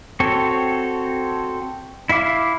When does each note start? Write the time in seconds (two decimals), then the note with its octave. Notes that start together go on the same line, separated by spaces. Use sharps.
0.20 C4 F#4 A4 C#5
2.09 E4 E5 F5 D6